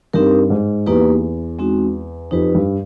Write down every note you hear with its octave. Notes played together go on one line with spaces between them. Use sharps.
G2 C4 D#4 G4 A#4
G#2
E2 A#3 D#4 G4 B4
G#3 C4 D#4 F#4
F2 D#4 G4 B4
G2